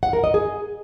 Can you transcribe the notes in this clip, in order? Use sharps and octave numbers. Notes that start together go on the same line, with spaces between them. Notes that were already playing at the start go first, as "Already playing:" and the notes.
F#5
A#4
D#5
G#4